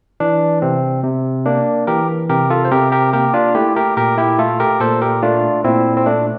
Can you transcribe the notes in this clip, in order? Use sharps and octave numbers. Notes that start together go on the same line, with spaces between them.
E3 D4
C3 C4
C3
A#3 D4
E3 G4 A#4
C3 G4 A#4
F4 A4
C5
C3 G4 A#4
G4 A#4
A#3 G4 A#4
D4 F4
A3 E4 G4
G4 A#4
A#2 G4 A#4
E4 G4
A3 F4 A4
G4 A#4
A#2 A4 C5
G4 A#4
A3 D4 F4
A#2 C4 E4
C4
A3 D4